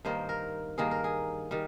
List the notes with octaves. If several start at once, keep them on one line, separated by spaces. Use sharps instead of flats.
G2 D#3 A#3 C5
A#4
G2 D#3 A#3 G#4
A#4
G#4
D#3 G3